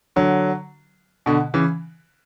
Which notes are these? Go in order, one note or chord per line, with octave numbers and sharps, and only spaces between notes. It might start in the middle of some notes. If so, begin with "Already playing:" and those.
D3 F#3
B2 D3
C#3 E3